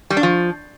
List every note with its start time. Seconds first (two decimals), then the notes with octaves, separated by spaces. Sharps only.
0.10 G3
0.17 D4
0.23 F3